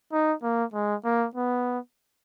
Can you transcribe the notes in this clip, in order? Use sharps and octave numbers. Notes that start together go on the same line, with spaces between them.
D#4
A#3
G#3
A#3
B3